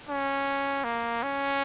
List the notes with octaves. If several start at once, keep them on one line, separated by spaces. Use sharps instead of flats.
C#4
A#3
C#4